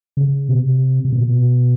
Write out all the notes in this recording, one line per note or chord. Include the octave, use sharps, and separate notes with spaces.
C#3
B2
C3
C3
B2
A#2
B2